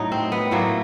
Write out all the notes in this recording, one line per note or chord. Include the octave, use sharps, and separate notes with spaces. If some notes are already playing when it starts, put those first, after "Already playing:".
Already playing: A2 F#3 A3 D#4
C4
B3
A2 F#3 A3 A#3